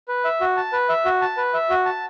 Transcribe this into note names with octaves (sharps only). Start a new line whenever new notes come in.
B4
E5
F#4
A5
B4
E5
F#4
A5
B4
E5
F#4
A5